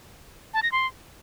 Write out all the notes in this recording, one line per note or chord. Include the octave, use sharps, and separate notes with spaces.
A5
A#6
C6